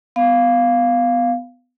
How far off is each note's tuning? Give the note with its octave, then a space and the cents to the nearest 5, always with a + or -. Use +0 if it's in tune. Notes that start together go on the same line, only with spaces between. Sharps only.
B3 +15 F5 +0